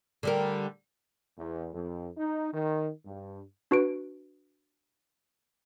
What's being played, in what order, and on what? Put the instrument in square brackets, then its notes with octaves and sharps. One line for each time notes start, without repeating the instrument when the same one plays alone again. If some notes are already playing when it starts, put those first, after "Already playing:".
[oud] D3 G3 A#4
[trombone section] E2
F2
D#4
D#3
G2
[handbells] D4 F#4 B4 D7